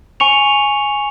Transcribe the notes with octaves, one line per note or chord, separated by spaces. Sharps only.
G#5 C#6 C#7 F7